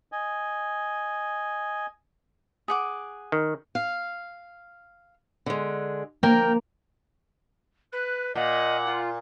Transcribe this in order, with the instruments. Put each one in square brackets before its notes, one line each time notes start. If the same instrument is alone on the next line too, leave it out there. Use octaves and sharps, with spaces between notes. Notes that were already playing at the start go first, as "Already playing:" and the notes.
[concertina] D#5 G#5
[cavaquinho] G#4 F#5 D6
[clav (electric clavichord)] D#3
[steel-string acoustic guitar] F5
D3 G#3
[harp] A#3 [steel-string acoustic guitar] A#4 G5
[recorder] B4 [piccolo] F#6
[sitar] A#2 [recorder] D#5 [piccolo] F#5
[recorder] F4